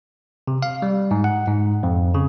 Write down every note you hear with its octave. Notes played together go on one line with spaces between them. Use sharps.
C3
F5
G3
G#2
F#5
G#2
F2
C#3